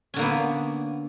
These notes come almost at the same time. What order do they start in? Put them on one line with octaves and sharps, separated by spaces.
C#4 D3 A#3 B3